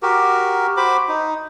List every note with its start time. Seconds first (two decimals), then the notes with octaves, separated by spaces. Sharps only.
0.03 F#4 G4 A#4
0.77 F#4 C5 B5 D6
1.08 D#4